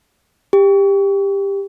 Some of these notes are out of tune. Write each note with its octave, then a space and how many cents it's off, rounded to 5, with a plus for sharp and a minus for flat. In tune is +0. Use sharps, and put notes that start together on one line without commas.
G4 +15